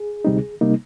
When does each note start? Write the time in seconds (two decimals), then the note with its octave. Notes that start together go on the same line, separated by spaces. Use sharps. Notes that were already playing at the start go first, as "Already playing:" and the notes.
Already playing: G#4
0.25 D2 C3 G3 C4 D#4
0.61 C3 G3 A#3 D#4